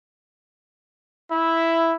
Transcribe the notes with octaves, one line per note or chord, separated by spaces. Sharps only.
E4